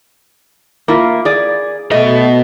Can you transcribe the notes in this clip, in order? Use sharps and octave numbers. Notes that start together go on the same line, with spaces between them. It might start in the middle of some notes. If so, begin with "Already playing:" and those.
A#3 E4 F4
G#4 D5
B2 A3 D#5